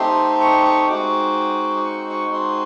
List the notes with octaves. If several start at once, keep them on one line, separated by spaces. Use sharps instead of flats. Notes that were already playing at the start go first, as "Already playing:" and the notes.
Already playing: A3 C4 D#4 G4 C6
C#6
C#6
G#3 C4 D#4 F#4 D6
C#6
C#6
C6